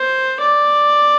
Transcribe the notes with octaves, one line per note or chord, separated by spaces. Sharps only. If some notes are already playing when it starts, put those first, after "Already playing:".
Already playing: C5
D5